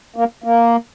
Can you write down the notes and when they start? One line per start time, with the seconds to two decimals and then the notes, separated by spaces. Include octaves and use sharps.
0.16 A#3
0.44 A#3